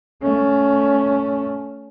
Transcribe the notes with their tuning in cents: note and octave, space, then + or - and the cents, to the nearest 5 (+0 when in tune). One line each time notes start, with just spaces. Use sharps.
A3 +0 C#4 +10